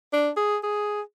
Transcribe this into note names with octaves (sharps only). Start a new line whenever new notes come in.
D4
G#4
G#4